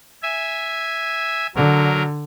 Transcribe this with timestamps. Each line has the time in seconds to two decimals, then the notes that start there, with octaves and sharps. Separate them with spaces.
0.23 E5 G#5
1.56 D3 F#3 A#4